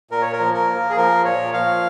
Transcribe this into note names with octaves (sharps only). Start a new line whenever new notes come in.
A#2 A#4
C#5
A#4
F3
A#4
A#3
G#4
F3 A#4
A#2 C#5
F3 F5